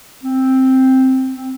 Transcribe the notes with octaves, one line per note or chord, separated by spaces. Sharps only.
C4
C4